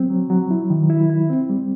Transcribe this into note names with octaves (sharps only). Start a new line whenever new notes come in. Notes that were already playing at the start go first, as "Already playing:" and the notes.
Already playing: F#3 C4
F#3
F#3
E4
D#3
E4
E4
C4
G3